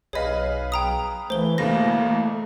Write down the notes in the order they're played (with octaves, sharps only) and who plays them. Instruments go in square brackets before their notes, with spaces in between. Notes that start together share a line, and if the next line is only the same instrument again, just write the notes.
[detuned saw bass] B1 [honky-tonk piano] G#4 B4 F5 [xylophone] C#5 D#5
[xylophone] G5 A#5 D#6
[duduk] E3 [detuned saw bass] A3 [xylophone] C5 G7
[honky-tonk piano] A1 E2 B2 [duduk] A#3 [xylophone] A#6